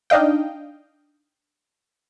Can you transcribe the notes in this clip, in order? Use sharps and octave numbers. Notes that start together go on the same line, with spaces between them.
D4 D#4 D#5 F5 G5